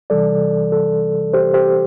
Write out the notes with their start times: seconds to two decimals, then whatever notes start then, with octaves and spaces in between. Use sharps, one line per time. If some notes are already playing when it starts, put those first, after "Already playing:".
0.10 C3 E3 G3 A4 D5
0.72 A4
1.33 G4 C5
1.54 G4 C5